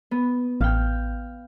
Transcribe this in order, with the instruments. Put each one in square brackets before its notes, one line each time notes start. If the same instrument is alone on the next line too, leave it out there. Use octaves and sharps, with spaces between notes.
[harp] B3
[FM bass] A1 [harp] F5 G5